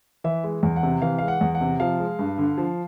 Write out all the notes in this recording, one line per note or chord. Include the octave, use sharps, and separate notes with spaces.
E3 E5
G#3
E2
F#5
C3
E3 F5
G#3 F5
F#5
E2
F#5
C3
F3 F5
G#3
G2
D3
F3